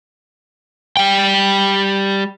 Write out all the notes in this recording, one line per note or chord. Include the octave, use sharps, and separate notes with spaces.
G3 G5